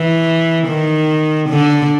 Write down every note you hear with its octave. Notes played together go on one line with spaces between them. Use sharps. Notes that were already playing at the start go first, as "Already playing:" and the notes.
Already playing: E3
D#3
D3